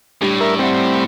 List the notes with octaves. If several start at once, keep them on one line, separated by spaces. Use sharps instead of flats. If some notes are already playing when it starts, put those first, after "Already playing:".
A2 G3 D4 G4
A#4 E5
G3 C4 D5 E5 F#5